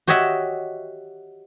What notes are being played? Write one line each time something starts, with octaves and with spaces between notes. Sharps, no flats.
F#4 G4 C#5 D#5 E5 F#5